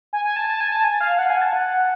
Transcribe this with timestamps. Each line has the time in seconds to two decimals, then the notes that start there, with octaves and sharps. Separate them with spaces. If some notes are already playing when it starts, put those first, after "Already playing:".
0.13 G#5
0.25 G#5
0.36 A5
0.49 A5
0.60 G#5
0.72 A5
0.84 G#5
1.01 F5
1.19 F#5
1.30 G#5
1.41 A5
1.53 F#5